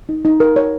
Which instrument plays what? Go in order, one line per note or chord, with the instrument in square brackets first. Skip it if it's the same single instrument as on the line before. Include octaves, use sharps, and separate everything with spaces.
[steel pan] D#4
D#4
A#4
C#5